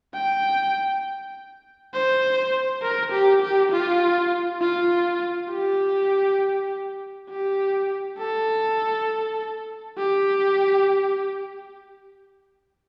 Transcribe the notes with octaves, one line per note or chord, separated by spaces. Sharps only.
G5
C5
A#4
G4
G4
F4
F4
G4
G4
A4
G4